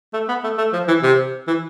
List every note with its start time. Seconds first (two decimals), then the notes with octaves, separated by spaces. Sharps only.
0.13 A3
0.28 B3
0.44 A3
0.58 A3
0.73 F3
0.88 E3
1.02 C3
1.47 E3